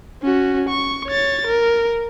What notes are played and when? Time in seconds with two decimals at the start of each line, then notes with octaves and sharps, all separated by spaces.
0.23 C#4 F#4
0.69 C#6
1.07 C#5 A6
1.47 A#4